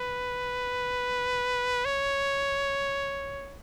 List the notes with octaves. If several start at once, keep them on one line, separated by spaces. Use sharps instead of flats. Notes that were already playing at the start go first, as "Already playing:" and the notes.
Already playing: B4
C#5